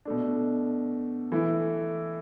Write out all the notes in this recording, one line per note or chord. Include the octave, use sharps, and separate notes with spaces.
B2 A3 D4
E3 A3 E4